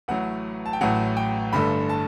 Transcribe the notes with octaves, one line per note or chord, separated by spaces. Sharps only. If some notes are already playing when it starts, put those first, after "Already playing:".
A1 A2 F#3 F#5
A5
G5
A1 A2 F#3 F#5
G5
G1 G2 D3 A3 B5
A5